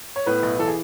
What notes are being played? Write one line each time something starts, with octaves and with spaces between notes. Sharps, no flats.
C#5
A2 B3 B4
B1
E3 A4
G#4